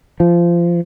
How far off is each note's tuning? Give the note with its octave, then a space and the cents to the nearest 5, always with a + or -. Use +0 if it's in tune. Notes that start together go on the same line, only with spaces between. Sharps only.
F3 -20